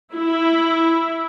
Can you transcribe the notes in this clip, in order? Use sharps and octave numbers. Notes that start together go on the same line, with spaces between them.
E4